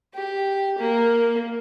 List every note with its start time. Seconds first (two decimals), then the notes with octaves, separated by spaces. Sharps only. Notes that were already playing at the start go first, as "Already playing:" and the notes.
0.14 G4
0.78 A#3